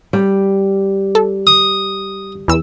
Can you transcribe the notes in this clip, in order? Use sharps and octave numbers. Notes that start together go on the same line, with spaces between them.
G3
A4
D#6
E2 E6